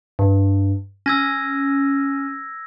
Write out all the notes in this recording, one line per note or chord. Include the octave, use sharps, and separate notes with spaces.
G2
C#4 E6 G#6 A#6